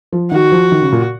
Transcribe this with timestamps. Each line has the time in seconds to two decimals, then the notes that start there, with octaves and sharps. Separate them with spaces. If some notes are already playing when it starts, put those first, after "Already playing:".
0.12 F3
0.31 D#3 F#4
0.52 F3
0.72 D#3
0.82 C#3
0.92 A#2